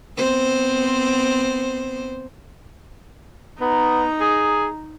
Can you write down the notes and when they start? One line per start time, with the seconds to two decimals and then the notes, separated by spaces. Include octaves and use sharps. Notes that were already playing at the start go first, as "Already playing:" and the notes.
0.17 B3 C4 C5
3.60 B3 D#4 A#5
4.20 G#4